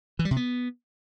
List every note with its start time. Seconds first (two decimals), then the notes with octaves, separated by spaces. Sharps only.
0.19 E3
0.25 G3
0.31 C3
0.37 B3